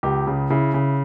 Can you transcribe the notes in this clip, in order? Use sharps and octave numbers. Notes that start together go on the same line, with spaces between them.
C#2 G4
C#3
C#3 E4
C#3